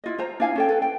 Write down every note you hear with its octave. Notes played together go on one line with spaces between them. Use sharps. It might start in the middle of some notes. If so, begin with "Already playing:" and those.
E4 F4 D#5
F4 C5 A#5
D4 E4 F5 G#5
C#4 A4 G5
A4 B4
G5